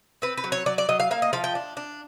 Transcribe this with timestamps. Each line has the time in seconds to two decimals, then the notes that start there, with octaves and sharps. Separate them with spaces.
0.22 C4 B4
0.37 B4
0.44 F#3
0.52 C#5
0.66 F#3 D5
0.78 D5
0.89 F#3 D#5
1.00 F5
1.11 A#3 F5
1.22 D#5
1.33 F3 F5
1.44 G5
1.55 D4
1.77 D4